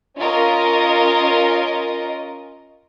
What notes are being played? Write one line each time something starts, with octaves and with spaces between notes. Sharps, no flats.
C#4 F4 A#4 D#5